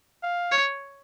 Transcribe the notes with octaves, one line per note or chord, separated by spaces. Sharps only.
F5
C#5